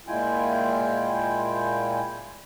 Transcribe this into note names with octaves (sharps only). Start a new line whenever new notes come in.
A#2 G#3 E4 F4 G5 G#5